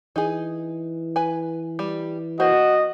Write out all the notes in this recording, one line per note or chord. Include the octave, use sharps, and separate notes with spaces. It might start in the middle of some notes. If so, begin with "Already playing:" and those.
E3 D#4 G#4
B4 G#5
G3
A#3 F#4 C5 D#5